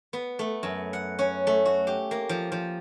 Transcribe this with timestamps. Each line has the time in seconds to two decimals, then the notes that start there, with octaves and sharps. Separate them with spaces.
0.13 B3
0.39 A3
0.63 F#2
0.93 F#5
1.19 C#4
1.47 A3
1.66 F#4
1.87 G4
2.11 A#3
2.29 F3
2.52 F3